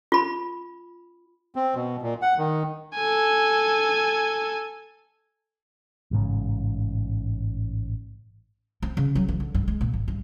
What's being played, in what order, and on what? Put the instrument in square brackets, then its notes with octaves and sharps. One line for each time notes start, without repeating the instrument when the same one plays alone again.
[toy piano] F4 B5
[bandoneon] C4
B2
A#2
F#5
D#3
[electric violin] A4 G#5
[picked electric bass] A1 G#2 C#3
[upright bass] C4
C#3
F#3
E3
D3
G2
G#3
A#2
G#1
G2